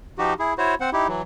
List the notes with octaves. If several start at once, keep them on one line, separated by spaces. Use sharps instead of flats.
F3 D#4 F#4 G4
E4 G#4
E4 F#4 C5 C#5
C4 C5 F#5
D#4 E4 G4
E3 F#3